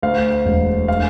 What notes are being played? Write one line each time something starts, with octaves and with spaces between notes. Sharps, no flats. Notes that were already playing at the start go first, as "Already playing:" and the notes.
D2 F5
E1
F5